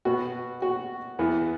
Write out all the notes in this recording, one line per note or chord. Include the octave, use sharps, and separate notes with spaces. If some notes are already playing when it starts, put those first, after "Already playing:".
B2 B3 F#4
F#4
E2 E3 B3